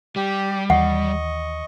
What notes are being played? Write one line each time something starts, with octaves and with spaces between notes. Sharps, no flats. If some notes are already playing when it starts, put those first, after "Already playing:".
G3 G4
D#2 E3 D#5 F#5 C#6